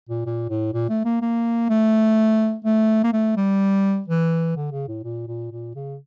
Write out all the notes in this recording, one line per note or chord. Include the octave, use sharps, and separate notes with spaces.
A#2
A#2
A2
A#2
A3
A#3
A#3
A3
A3
A#3
A3
G3
E3
D3
C#3
A2
A#2
A#2
A#2
C#3